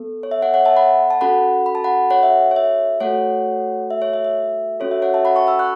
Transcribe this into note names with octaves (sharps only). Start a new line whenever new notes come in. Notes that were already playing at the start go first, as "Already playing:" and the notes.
Already playing: B3 A4
C#5
E5
C#5 F#5
C#5 F#5
E5 A5
F#5 B5
A5
C#4 F#4 A4 F#5 B5
B5
A5
F#5 B5
C#5 F#5
E5
C#5
E5
A3 F#4 A4 C#5 F#5
E5
C#5
E5
E5
C#4 F#4 A4 C#5
E5
C#5 F#5
E5 A5
F#5 B5
A5 C#6
B5 E6
C#6 F#6